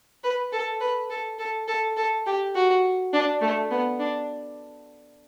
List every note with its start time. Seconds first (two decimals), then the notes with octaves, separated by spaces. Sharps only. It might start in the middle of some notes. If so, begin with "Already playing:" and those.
0.24 B4
0.53 A4
0.81 B4
1.10 A4
1.39 A4
1.68 A4
1.97 A4
2.26 G4
2.55 F#4
3.13 D4
3.41 A3
3.71 B3
4.00 D4